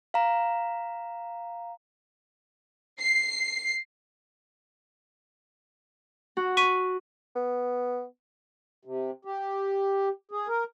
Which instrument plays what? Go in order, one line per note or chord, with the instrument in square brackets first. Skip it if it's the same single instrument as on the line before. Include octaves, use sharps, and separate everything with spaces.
[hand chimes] F5 A#5
[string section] C7
[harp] F#4
[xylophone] C#6 B6 D#7
[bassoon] B3
[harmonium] C3
G4
G#4
A#4